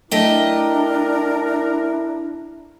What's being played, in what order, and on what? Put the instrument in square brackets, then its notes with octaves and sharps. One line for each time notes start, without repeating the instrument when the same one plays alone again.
[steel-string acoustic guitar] A3 D#5 G5 [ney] D4 [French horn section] E4 [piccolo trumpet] A#4